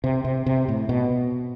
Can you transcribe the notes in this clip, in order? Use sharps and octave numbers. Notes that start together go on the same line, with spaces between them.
C3
C3
C3
A2
B2